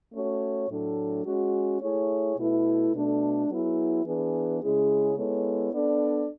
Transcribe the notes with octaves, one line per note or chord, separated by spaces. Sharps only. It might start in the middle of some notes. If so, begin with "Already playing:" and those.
A3 C#4 F#4 C#5
A2 F#3 A3 D4 A4
G#3 C#4 F#4
A3 E4 G#4 C#5
B2 A3 E4 B4
B2 A3 D4 A4
F#3 B3 E4 G#4
E3 B3 D4 G#4 B4
C#3 G#3 C#4 E4 G#4
G#3 B3 E4 A4 C#5
B3 D4 A4 D5